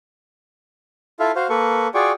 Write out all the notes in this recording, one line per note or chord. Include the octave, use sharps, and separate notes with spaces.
E4 F4 A4 E5 F5
F#4 C5 F5
A#3 A4 B4 C#6
F4 F#4 G#4 D5 G5 C#6